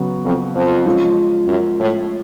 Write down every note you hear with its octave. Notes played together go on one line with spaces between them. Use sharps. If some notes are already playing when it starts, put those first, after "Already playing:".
Already playing: C#3 F#3 B3 F#4
F2
F2
F3 G#3 C#4 F4
F#2
A2